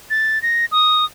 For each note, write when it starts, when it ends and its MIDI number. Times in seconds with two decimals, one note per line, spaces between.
0.10 0.41 93
0.42 0.65 94
0.72 1.05 87